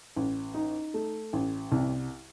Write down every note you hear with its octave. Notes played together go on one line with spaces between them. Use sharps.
A1
D#4
A3
A1
C2